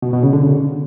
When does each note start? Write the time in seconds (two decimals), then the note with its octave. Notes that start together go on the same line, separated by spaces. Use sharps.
0.02 B2
0.13 B2
0.23 C#3
0.33 D3
0.43 C#3